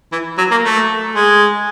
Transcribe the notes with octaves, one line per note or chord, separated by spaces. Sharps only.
E3
F#3
A#3
A3
G#3